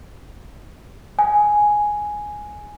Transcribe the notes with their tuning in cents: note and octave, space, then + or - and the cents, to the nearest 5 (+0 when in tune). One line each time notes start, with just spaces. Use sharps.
G#5 +5